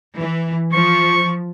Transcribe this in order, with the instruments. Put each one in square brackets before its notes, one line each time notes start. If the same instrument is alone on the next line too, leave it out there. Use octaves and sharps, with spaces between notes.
[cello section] E3
[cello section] F3 [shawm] C#6